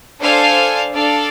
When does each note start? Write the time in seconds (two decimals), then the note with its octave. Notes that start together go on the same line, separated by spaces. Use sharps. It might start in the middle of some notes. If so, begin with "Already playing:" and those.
0.20 D4 A4 C5 F5 G#5
0.92 D4 A4 D5 F5